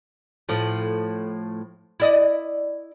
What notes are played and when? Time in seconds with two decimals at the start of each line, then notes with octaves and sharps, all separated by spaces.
0.49 A2 F3
2.00 E4 D5 D#5